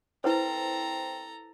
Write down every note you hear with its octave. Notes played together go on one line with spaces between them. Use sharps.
C4 E4 A4 B4 C5 A#5